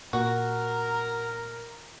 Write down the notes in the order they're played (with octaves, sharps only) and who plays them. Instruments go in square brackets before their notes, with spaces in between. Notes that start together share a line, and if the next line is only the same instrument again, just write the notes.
[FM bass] A#2 [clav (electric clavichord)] F#4 [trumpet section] A#4